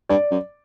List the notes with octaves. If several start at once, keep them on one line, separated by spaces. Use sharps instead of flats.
G2 D5
F#2